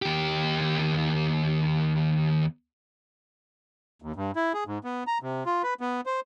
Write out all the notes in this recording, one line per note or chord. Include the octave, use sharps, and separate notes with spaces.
D#2 G4
D#2
G2
E4
G#4
G#2
B3
A#5
C3
F4
B4
B3
C5